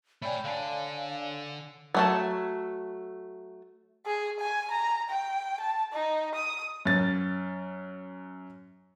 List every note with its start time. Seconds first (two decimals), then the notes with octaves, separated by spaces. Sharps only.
0.22 A3 C#5 D5 G5 G#5 B5
0.44 D3 D4 F5
1.94 F#3 A3 A5
4.06 G#4
4.40 G#5
4.71 A#5
5.10 G5
5.61 A5
5.93 D#4
6.35 D#6
6.86 F#2 A6